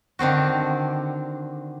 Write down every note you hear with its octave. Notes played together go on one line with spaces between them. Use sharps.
D3 D#3 C4 F#4